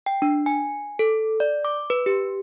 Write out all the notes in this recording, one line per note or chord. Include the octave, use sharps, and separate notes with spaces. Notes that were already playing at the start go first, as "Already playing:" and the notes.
G5
D4
G#5
A4
D5
D6
B4
G4